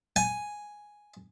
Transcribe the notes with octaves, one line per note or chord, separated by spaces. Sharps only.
G#5